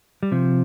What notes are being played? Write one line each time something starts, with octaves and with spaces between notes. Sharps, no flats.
G3
C3 F3